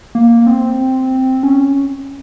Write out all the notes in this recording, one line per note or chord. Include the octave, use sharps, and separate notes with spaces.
A#3
C4
C#4